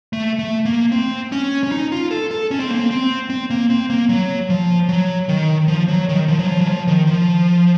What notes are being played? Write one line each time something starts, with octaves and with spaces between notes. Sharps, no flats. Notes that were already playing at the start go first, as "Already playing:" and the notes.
A3
A3
A#3
C4
C#4
C#4
D#4
F4
A4
A4
C#4
C4
A#3
C4
C4
C4
A#3
C4
A#3
F#3
F3
F#3
D#3
F3
F#3
D#3
F3
F#3
F3
F#3
F3
D#3
F3